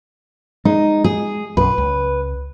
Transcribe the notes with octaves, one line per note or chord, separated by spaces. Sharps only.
G#3 D#4
G#4
B1 F#2 B4
C#2